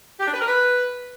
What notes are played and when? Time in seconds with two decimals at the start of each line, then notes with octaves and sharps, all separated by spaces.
0.20 G4
0.27 D4
0.34 B4
0.41 A#4
0.48 B4